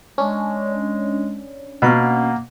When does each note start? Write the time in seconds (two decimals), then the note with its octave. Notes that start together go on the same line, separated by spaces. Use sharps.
0.18 G#3 C#4 D4
1.82 B2 A#3 F#5 A#5 F6